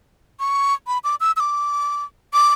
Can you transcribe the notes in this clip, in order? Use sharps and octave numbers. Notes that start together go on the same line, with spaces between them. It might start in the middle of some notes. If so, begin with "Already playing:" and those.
C#6
B5
D6
E6
E6
D6
D6